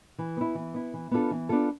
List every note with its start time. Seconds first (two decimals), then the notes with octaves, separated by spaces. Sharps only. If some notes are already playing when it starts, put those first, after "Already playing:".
0.18 E3
0.37 B3 E4
0.55 E3
0.74 B3 E4
0.94 E3
1.11 B3 D4 F4 A4
1.31 E3
1.49 B3 D4 F4 A4